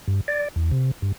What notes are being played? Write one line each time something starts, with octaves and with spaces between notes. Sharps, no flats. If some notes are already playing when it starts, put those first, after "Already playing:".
G2
D5
E2
C3
G2